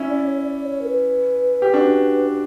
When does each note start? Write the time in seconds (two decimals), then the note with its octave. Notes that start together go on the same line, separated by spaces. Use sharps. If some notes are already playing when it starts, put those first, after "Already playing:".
Already playing: C#4 E4
0.09 D5
0.26 C#5
0.42 D5
0.64 C#5
0.81 A#4
0.86 B4
1.62 G4
1.74 D4 F#4